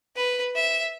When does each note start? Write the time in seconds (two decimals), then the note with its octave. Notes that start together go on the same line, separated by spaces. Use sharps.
0.16 B4
0.56 E5